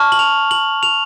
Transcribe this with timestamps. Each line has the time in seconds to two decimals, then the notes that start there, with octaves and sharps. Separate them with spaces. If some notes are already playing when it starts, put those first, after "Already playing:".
Already playing: A5 C#6 F6
0.12 F#7
0.19 F7
0.51 F#7
0.83 F7